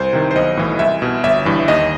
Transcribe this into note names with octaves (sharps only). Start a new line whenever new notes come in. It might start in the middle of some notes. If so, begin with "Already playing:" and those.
Already playing: C2 C5
C3 D#3
C5
B1 D#5
A2 E3
C2 E5
B2
G1 E5
G2 E3
D#2 D#5